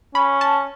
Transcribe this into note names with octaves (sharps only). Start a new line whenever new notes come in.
C#4 B5
A5